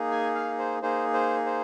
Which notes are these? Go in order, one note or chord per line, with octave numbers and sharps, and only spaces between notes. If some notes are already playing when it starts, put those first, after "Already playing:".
Already playing: A#3 D#4 G#4
G#5
F5
C5
A#3 D#4 G#4 C5
C5
C5